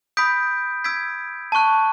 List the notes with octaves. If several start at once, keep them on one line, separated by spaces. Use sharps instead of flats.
B5 D#6 G6 B6 D7
E6 G#6 B6 D7
A5 C#6 F#6